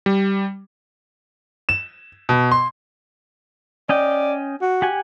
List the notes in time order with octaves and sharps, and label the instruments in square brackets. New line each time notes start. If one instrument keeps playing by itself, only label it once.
[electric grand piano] G3
[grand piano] E7
B2
C6
[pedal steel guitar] C#4 D#5 G5 [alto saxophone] D5
[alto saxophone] F#4
[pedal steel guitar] G4 F#5 G#5